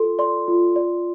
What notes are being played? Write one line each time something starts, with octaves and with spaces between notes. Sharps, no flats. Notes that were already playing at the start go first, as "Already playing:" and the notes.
Already playing: F4 A4 C6
D5 C6
F4
D5